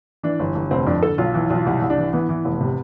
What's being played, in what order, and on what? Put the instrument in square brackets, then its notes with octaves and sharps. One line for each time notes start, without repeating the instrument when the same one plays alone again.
[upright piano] E3 D4
G1
G1
F1 C4
F2 D4
D3 A4
B1 F4
E3
B1
F4
C2 E4
C2
D4
E3
E3 B3
E3
F1
C3